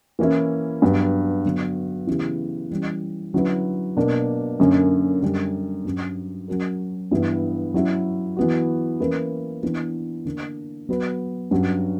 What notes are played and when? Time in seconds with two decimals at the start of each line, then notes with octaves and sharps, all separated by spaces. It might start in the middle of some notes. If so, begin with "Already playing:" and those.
0.19 E3 A#3 C#4 E4
0.82 G2 F#3 B3
1.45 D3 F#3 B3 F#4
2.07 C#3 E3 B3 E4 G4
2.70 E3 G3 C#4
3.34 D3 F#3 C#4 E4 B4
3.97 B2 A#3 D4
4.60 F#2 D3 A#3 C#4
5.22 F#2 D3 G3 C#4
5.85 G2 F#3 C#4
6.48 F#3 C#4 F#4 A#4
7.11 G2 E3 B3 E4
7.74 F#3 C#4 E4
8.37 E3 B3 F#4
9.00 E3 A#3 C#4 E4 B4
9.63 E3 B3 D4
10.25 D3 A#3 D4
10.89 F#3 B3 F#4 B4
11.51 G2 F#3 C#4 F#4